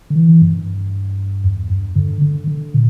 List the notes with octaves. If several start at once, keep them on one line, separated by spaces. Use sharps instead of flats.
D3
E3
G2
E2
G2
D3
D3
D3
A#2